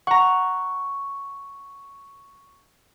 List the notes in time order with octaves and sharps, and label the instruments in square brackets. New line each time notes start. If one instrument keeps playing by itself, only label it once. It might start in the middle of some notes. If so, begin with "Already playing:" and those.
[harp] F#5 A#5 [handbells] C#6